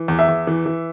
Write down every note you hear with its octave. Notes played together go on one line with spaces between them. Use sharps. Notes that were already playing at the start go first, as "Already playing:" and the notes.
Already playing: E3
E2
E5
E2
E3
E3